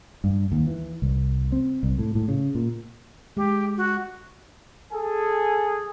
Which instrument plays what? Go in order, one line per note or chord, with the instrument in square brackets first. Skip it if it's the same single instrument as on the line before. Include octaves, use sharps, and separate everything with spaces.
[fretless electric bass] G2
D#2
E3
C2
C4
C2
A2
A2
C#3
A#2
[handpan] G#3 [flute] G4
[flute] F#4
[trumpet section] G#4 A4 G#5